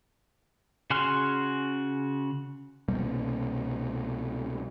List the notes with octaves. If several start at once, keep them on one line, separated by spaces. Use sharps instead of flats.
C#3 F#4 G#5 C6 F6
C2 B2 G3 A#3